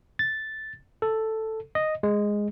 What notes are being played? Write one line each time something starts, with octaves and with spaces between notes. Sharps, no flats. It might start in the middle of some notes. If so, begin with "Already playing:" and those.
A6
A4
D#5
G#3